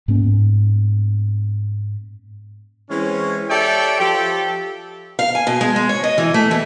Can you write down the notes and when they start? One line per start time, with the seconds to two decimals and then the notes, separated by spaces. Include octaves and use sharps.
0.08 G#2 A#3 B3 C#4
2.90 E3 G#3 C4 C#4
3.49 G4 A4 C#5 D5 E5 G5
3.99 F3 G4 A4
5.19 F5
5.35 G#5
5.47 B2
5.61 G#3
5.76 G#3
5.89 C#5
6.04 D#5
6.18 E3
6.34 A3
6.51 E3